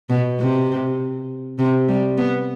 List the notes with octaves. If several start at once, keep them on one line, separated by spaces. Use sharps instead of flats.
B2
C3
C3
G3
B3